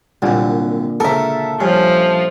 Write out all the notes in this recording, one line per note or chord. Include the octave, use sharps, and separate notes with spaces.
C2 F#2 A#2 D3
C#3 A4 A#4 E5
G2 F3 C#4